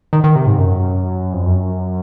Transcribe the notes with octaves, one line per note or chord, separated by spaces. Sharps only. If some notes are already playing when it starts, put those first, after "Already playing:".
D#3
D#3
C3
G#2
F#2
F2
F#2